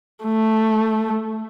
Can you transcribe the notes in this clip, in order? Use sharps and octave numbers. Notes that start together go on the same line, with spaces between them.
A3